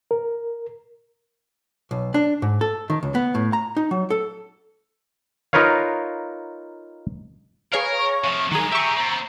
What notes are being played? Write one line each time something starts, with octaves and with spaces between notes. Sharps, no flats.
A#4
B1
D4
G#2
A4
D#3
C#2
B3
A2
A#5
D#4
F#3
A4
D#4 F4 A#4 B4 C#5 F5
G#4 A#4 B4 C#5 F5
C#6
C3 F3
D#3 F#3 G#3 G#4 A#5
G4 G#4 E5 C#6
B3 C4